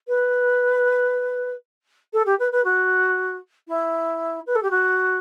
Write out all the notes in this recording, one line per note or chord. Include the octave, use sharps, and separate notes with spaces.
B4
A4
G4
B4
B4
F#4
E4
B4
A4
G4
F#4